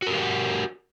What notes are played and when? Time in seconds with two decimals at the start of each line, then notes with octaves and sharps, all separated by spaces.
0.02 F#4
0.06 A#4
0.11 G4
0.15 F5
0.19 F#5